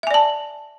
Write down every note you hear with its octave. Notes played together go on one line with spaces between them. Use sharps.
D5 E5 G#5 A5